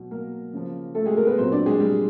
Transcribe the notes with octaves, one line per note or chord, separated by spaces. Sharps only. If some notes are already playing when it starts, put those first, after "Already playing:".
Already playing: B2 F#3
A#3 A#4
C#3 F3
A3 A4
G#3 G#4
A#3 A#4
B3 B4
A#2 F#3 C4 C5
D4 D5
G#3 G#4
G3 G4